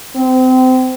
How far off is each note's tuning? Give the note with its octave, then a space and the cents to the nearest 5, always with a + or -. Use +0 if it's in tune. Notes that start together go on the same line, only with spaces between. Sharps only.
C4 -30